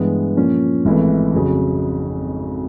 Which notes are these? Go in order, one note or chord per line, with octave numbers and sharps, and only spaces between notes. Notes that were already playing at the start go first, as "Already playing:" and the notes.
Already playing: G2 E3 G#3 B3
A#2 F3 A#3 C#4
G#1 G#2 E3 A3
F2 C#3 F#3